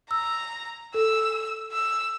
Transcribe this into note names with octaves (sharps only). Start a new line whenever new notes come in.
A#5 E6
A4 E6
E6